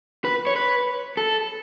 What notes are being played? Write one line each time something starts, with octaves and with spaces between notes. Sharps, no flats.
B4
C#5
B4
A4